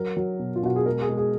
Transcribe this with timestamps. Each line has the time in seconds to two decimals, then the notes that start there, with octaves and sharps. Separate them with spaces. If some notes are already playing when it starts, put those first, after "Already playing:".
Already playing: F#3 A#4
0.17 F#3
0.39 B2
0.56 F4
0.63 B2 F#4
0.76 G#4
0.86 G#3 A#4
1.01 G#4
1.09 G#3
1.17 G#4